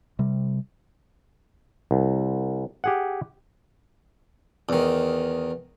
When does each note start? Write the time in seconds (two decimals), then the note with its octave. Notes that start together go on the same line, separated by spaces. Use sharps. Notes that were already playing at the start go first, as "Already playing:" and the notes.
0.19 C3 G3
1.91 C2
2.84 G4 G#4 F#5
4.69 E2 D#3